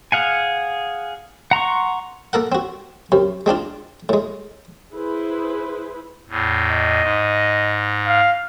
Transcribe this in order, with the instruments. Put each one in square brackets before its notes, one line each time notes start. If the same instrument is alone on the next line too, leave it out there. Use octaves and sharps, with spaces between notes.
[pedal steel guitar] G#4 F5 F#5 G#5
F#5 A#5 C6 C#6
[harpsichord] A#3 A4 A#4 F#5
C4 F#4
F#2 C3
G#3 C4 D4 F4
A2 G#3
[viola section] E4 G#4 B4 C5
[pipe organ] E2 A2
[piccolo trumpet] D#5
[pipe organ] G#2
[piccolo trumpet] F5